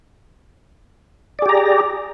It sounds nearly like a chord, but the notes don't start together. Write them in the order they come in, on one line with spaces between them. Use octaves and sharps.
D5 G#4 G4 A#5